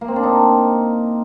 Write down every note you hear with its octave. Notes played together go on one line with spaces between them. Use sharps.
A#3
C4
D4
D#4